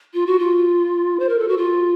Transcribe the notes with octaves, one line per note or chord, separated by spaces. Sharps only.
F4
F#4
F4
C5
A#4
A4
F#4
F4